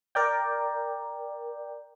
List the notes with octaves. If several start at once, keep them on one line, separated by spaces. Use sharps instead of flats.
A#4 D5 G5